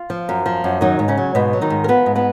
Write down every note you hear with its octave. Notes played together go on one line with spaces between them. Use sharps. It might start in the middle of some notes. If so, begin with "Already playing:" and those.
Already playing: F4
F3
F#2
F3
F#2
D#3 F#3 D#4
G#2
C#3 C#4
F#3
G#2 B2 B3
F#3
D#3 D#4
G#2
A#4
F3 B3 B4
G#2
B3 B4